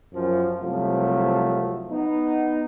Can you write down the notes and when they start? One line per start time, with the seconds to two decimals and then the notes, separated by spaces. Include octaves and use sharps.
0.13 F#2 F3
0.61 C2 F3 F#3 A3
1.92 B3 D#4